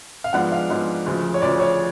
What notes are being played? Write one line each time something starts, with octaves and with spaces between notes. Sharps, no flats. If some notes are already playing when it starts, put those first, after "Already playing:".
F5
G#2 F3 G#3 B3 D4 F#5
F5
G#2 F3 G#3 B3 D4
D2 C#3 F3
C#5
D2 C#3 F3 D5
C#5